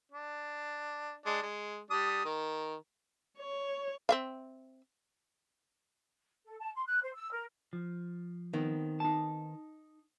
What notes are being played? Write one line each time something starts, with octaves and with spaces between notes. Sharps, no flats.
D4
G#3 D4
G#3
G3 D4 D#6
D#3 A#4
C#5
C4 E5 F5
A4
A5
C6
F#6
C5
E6
A#4
F3
D#3 B3 C4
D#4 A5